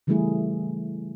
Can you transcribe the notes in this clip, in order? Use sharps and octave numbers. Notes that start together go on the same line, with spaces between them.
C#3 E3 G3 A3 E4 G#4